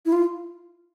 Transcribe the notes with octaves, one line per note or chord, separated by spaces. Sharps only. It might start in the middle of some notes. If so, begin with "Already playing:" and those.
E4
F4